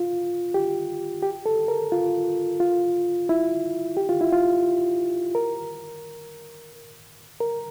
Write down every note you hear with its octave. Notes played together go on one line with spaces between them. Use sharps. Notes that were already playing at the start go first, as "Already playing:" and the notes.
Already playing: F4
G4
G4
A4
A#4
F4
F4
E4
G4
F4
E4
F4
A#4
A#4